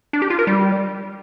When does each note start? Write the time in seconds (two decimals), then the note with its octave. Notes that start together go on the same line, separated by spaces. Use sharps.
0.13 D4
0.22 G4
0.30 F4
0.39 A#4
0.47 G3